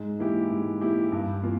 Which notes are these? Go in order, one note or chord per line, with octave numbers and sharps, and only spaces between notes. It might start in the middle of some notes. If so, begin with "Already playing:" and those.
Already playing: G#2
E3 A#3 E4 G4
G#2
E3 A#3 E4 G4
G2
E3 A#3 F4